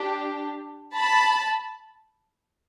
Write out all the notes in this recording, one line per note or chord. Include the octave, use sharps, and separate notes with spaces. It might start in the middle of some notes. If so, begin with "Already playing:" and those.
Already playing: D4 G4
A5 B5